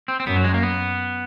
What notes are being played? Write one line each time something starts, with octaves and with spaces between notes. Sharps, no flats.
C4
C4
F#2 B3
F#3
G#3
A#3
B3